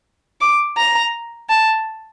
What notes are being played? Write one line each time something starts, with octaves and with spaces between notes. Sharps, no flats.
D6
A#5
A5